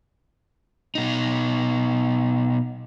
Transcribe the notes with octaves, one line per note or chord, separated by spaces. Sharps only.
B2 D#4